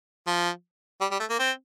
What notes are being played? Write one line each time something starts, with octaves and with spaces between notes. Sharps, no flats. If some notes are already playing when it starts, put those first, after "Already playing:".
F3
G3
G3
A3
A#3
C4